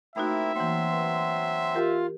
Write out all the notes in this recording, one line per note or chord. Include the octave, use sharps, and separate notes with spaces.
A3 A#3 C4 D#4 E4 F#4 E5
E3 F#3 A#3 C4 C6
B4
F4 G4 A#4